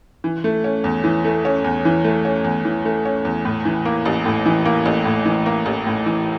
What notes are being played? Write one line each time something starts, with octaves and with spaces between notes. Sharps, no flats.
E3
A3
C#4
E2
E3
A3
C#4
E2
E3
A3
C#4
E2
E3
A3
C#4
E2
A2
E3
A#3
A1
A2
E3
A#3
A1
A2
E3
A#3
A1
A2
E3